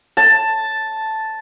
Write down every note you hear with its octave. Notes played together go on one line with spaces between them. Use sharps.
A5